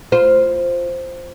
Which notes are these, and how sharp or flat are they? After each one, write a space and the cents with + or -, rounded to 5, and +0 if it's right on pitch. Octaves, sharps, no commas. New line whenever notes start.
F4 +0 C5 +0